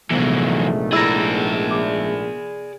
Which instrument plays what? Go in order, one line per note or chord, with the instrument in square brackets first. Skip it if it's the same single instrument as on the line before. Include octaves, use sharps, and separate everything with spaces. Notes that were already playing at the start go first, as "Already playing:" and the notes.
[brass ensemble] A#1 G#2 A3 [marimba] C3 B3 [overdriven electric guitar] E3 F#3
[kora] E4 A#4 [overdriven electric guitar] G#4 D5
[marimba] D6